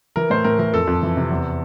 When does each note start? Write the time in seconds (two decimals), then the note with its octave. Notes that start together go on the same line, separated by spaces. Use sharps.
0.16 E3 A#4
0.30 A2 C5
0.44 A2 A#4
0.59 E3 A#4
0.73 F2 A4
0.87 F2
1.03 E3
1.17 C3
1.31 E2